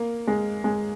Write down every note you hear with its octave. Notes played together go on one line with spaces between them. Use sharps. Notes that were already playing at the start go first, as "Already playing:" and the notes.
Already playing: A#3
G#3
G#3